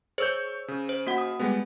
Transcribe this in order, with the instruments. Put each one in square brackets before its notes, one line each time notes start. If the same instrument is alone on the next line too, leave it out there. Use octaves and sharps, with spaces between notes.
[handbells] G#4 C5 [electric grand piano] C#5 E6 G6
[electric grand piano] C#3
[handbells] C5
A#3 F#4 F#5
D#6
[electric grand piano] G3 G#3 B3